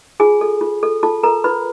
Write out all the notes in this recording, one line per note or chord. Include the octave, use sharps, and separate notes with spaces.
F4 G#4 G#5
A4
F4
A4
F4 A4 A5
A4 A#4 A#5
F4 B4 B5